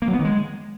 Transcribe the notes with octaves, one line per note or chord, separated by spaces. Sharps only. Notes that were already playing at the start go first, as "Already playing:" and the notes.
A#3
F#3
B3
D#3
G#3